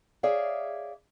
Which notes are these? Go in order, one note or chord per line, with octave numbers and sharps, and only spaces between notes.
G#4 C#5 D5 E5 F5